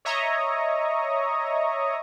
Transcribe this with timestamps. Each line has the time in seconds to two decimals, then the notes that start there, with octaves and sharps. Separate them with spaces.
0.05 C#5 D#5 E5 A#5 C#6 D#6